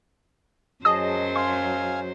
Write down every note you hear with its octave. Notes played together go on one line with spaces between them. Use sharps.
F#2 F#3 G#4 C5 D#5 A5 D#6
F5 G#5 C6